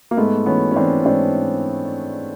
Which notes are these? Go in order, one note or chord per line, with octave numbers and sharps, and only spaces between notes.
A#3
G#2 A3 B3
E3 B3 C#4
C#4
E3 C4 D4
C#4
G#2 C4 D4